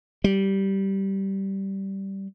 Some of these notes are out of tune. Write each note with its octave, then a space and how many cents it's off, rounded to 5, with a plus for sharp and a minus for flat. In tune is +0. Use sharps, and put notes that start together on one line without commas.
G3 -10